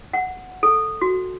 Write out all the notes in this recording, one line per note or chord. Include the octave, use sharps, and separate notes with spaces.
F#5
A4
F#4